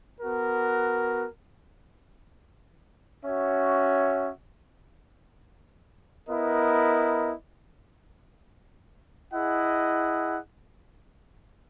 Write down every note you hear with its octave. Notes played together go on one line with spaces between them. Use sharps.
B3 F#4 A#4
C#4 F#4 C#5 E5
B3 E4 A#4 D#5
E4 G#4 D#5 F#5